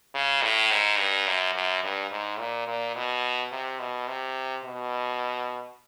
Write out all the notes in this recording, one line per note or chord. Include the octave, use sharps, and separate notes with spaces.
C#3
A2
G#2
G2
F#2
F#2
G2
G#2
A#2
A#2
B2
C3
B2
C3
B2